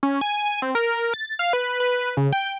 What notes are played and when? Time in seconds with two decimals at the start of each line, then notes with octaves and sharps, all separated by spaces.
0.03 C#4
0.21 G#5
0.62 C4
0.75 A#4
1.14 A6
1.39 F5
1.53 B4
1.80 B4
2.17 C#3
2.33 G5